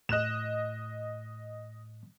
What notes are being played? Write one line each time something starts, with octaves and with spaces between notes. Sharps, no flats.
A2 D#5 F#6 E7